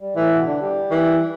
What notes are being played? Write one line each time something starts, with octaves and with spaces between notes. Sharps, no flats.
G3
A2 E3 A3
B2 B3
D3 D4
G3 G4
E3